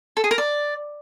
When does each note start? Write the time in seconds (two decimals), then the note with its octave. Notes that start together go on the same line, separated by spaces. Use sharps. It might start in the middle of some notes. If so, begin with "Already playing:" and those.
0.17 A4
0.24 G#4
0.31 A#4
0.38 D5